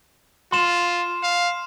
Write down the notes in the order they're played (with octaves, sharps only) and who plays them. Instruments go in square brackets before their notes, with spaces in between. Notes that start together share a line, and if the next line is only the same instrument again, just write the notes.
[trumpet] F4 [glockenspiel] C6 E7
[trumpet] F5